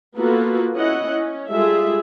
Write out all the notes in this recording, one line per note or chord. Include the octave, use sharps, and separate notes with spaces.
A#3 B3 F4 F#4 A4 B4
C#4 E4 D#5 F#5
C#4
G3 G#3 F4 G#4 A4 E5